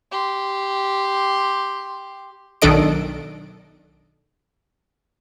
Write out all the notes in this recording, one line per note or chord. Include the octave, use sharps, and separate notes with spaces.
G4 C6
B1 D#3 D4 A4 D#5 D7